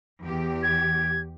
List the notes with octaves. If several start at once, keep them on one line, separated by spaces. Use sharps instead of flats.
E2 G4
G#6